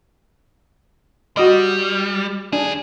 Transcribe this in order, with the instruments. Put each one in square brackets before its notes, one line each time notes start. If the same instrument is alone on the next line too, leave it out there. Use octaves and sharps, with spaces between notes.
[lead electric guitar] G3 [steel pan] F#4 D#5
[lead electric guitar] D#2 G#4 [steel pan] D4